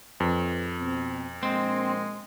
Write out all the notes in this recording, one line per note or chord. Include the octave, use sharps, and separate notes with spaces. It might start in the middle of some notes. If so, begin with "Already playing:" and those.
A#1 F2 B4
B2 C4
A#1 G#3 C4